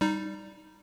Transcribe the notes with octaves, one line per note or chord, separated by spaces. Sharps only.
G3 D#4